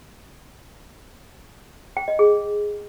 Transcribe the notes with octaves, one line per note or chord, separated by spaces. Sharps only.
G5
D#5
G#4